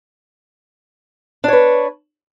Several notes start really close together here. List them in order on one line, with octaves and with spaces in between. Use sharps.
D4 C#5 B4